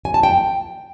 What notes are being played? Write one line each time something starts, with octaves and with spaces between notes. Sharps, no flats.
G#5
A5
G5